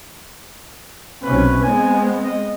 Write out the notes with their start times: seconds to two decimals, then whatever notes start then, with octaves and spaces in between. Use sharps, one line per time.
1.23 B1 C3 C#4 B4
1.63 G#3 B3 C4 G#5
2.24 D#5